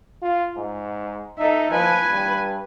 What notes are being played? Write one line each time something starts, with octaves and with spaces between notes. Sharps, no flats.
F4
G#2
D#4 A4 E5
F3 B4 G#5
G2